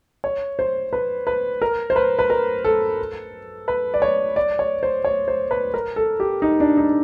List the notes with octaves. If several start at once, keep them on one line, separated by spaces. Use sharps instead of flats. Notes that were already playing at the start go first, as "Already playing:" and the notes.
C#5
C5
B4
B4
A#4
C5
B4
B4
A#4
A4
B4
D5
C#5
D5
C#5
C5
C#5
C5
B4
A#4
A4
G4
D#4
D4
D#4